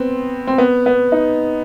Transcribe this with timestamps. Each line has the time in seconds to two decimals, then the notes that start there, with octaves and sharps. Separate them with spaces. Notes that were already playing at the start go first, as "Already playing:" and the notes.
Already playing: B3 C4
0.47 C4
0.58 B3
0.86 B3
1.12 D#4